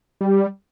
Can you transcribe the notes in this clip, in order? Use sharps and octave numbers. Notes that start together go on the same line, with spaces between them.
G3